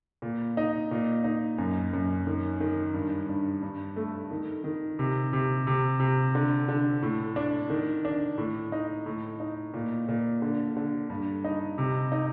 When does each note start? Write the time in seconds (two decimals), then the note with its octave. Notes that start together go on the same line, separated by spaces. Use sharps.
0.22 A#2
0.57 D#4
0.91 A#2
1.24 D#4
1.58 F#2
1.93 F#2
2.27 D#3
2.60 D#3
2.94 G2
3.29 G2
3.62 G2
3.96 A3
4.31 D#3
4.64 D#3
4.99 C3
5.33 C3
5.67 C3
6.00 C3
6.35 D3
6.68 D3
7.02 A2
7.36 D4
7.70 D#3
8.05 D4
8.38 A2
8.72 D#4
9.06 A2
9.40 D#4
9.74 A#2
10.09 A#2
10.42 D3
10.77 D3
11.10 G2
11.44 D#4
11.78 C3
12.12 D#4